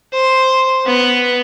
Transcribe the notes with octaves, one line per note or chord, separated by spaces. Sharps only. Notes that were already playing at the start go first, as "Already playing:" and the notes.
C5
B3